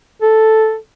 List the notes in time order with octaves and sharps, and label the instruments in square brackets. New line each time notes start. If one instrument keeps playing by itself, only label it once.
[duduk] A4